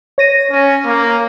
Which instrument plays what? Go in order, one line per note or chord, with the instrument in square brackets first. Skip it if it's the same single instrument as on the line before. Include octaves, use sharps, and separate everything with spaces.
[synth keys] C#5 A#6 D#7
[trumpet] C#4
A#3